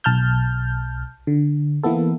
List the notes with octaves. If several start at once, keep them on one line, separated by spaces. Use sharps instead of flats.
B1 A5 F6 G6
D3
E3 A#3 B3 A4